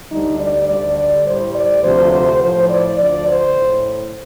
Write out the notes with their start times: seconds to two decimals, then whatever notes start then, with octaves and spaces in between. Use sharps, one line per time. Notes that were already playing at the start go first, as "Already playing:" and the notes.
0.11 D2 D3 G3 D#4
0.40 D5
0.69 D2 D3 G3 D5
0.98 D5
1.26 A2 G3 C5
1.55 D5
1.84 D2 C3 F3 C5
2.12 C5
2.42 A2 F3 C5
2.70 D5
2.98 D2 D3 F3 D5
3.28 C5
3.56 A2